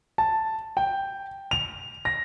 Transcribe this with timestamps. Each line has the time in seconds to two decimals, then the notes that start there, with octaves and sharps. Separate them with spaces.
0.18 A5
0.77 G5
1.51 F7
2.05 A#6